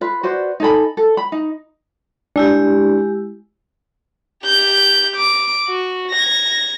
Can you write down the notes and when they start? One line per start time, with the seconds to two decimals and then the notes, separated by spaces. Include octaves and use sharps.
0.01 F4 B4
0.23 F#4 B4 C5 D5
0.60 D#4 G#4 A4 B5
0.97 A4
1.17 B5
1.32 D#4
2.36 G#3 D4 E4 G4
4.45 G4 G6
5.16 D6
5.68 F#4
6.11 G#6 A#6